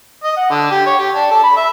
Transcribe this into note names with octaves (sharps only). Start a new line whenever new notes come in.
D#5
F#5
D3
G4
C#5
G4
D4
A4
B5
E5